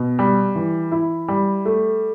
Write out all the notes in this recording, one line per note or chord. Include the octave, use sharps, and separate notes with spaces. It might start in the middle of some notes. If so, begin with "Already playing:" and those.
Already playing: B2
G3
E3
E4
G3
A3